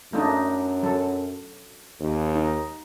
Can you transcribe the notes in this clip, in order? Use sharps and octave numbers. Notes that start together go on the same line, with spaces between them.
F#2 A3 D4 D#4
F#3 A4
D#2
D#4